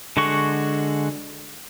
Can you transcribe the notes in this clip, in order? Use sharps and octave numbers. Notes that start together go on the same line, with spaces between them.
D3 G#3 F#4 C#6